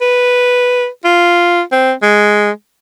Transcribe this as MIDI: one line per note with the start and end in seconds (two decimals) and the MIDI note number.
0.01 0.87 71
1.04 1.61 65
1.72 1.92 60
2.02 2.51 56